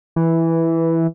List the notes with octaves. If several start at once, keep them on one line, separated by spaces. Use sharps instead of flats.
E3